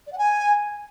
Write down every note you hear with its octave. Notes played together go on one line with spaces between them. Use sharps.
D5
F#5
G#5